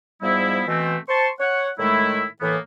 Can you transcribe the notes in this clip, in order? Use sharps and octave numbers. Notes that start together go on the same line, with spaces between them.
G#2 F3 G3 B3 E4
B2 E3 A3 C4
C5 A5 C6 C#6
C#5 F#5
A2 D#3 G#3 A3 E4
A2 E3 A#3 B3